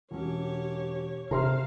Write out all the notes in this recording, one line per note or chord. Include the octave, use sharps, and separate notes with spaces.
E1 C#4 G4 C#5
C3 C5 F5 A#5 C6 F6